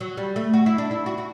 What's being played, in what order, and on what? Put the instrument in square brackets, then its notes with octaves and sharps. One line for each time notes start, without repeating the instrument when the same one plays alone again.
[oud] F#3
G3
A3
F#4
E4
D4
E4
F#4
F#4